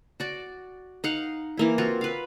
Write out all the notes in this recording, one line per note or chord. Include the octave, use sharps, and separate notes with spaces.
F#4 D5
D#4 D#5 F5 F#5
E3 A#3 E4
C4 F4 F#4
B4 F5